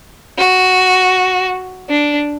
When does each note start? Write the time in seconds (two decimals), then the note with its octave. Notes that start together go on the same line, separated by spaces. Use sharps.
0.38 F#4
1.90 D4